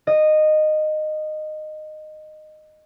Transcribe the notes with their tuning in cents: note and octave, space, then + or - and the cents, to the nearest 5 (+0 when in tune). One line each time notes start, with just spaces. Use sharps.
D#5 -15